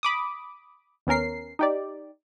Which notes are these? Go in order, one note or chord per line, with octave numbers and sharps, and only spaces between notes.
B5 D6 D#6
D#2 B3 C#4 A#4 C7
D#4 G4 D5